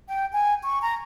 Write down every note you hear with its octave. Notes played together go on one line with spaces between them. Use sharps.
G5
G#5
C#6
A#5